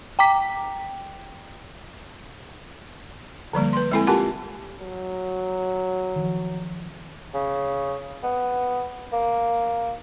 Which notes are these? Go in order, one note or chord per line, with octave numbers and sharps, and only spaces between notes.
G5 A#5 D6 B6
D3 F3 G3 A#3
B4 C6
G#3 C4 E4 A4 G#5
F4 G4 A#4 F#5 G#5 A5
F#3
D#3 F3
C#3
B3
A#3